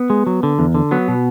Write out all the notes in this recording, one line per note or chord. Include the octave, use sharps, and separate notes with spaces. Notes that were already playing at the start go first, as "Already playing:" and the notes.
Already playing: B3
G#3
F#3
D3
E2
D3
F#3 B3
B2